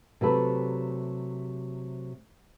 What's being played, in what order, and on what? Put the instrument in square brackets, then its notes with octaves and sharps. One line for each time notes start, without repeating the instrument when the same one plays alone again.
[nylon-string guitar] C3 F#3 A3 G4 A4 B4